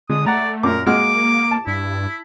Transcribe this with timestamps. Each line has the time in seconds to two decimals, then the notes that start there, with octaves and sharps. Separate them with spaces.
0.10 D3 G#3 D#6
0.26 A3 D5 F#5 A#5
0.63 F#2 A#2 A#4 D6
0.87 G#3 A#3 F#4 D6 F6
1.51 A5
1.67 G2 E4